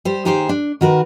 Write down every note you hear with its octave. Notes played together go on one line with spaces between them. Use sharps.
G3 G4 C5
D#2 D#4 G4 G#4 C5
D4
D#3 F#4 A#4 B4